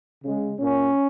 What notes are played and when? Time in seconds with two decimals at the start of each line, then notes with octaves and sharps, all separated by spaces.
0.23 C#3 G#3
0.60 A#2 A#3 C#4